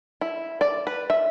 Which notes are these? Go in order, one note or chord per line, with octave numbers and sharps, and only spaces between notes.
E4
D5
B4
E5